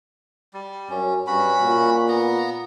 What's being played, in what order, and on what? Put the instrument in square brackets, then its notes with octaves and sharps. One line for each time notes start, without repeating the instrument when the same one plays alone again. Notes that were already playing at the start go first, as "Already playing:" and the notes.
[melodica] G3
[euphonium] F#2 [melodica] C#4
[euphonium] G2 [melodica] C#4 F#4 B5
[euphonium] A#2
[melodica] B3 A#5